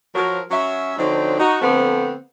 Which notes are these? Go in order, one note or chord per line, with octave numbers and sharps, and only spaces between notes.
F3 F#3 A#4
F#3 C#4 E5
D3 F3 F#3 C4 D4 D#4
D#4 F#4
D3 F3 A3 B3 C4